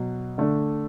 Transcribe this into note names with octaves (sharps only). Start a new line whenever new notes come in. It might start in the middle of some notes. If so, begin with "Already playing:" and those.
Already playing: B2 F#3
D3 A3 D4